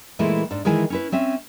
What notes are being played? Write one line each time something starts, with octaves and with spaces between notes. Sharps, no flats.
A#2 E3 G#3 A3 E4
G#2 D4
D#3 E3 G#3 E4 G#5
C#4 E4 B4
C4 C#4 E5